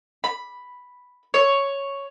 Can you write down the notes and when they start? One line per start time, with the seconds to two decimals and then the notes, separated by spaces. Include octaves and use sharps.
0.24 B5
1.34 C#5